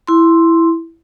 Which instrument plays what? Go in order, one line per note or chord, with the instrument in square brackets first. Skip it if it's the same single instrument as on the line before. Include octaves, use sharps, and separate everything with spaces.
[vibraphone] E4 C6